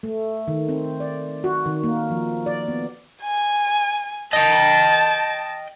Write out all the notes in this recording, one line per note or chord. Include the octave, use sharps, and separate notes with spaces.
A3
D#3
C4
D5
F#4
D#3
A#3
F3
D5
B3
G#5
D#5 G5 A5